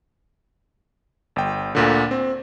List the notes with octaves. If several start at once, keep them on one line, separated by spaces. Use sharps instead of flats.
G1 G5
D2 A#2 D3
C4